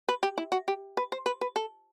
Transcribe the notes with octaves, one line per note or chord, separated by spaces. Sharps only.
B4
G4
E4
F#4
G4
B4
C5
B4
B4
A4